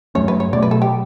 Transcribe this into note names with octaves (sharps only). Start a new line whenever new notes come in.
G2 F#3 A3 C#4 C#5
B4
C#5
B2 F#3 A3 D5
B4
A4
G4